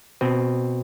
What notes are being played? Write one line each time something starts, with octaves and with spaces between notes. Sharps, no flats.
B2 C4